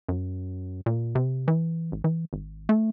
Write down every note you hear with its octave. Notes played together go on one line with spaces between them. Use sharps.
F#2
A#2
C3
E3
A1
E3
G#1
A3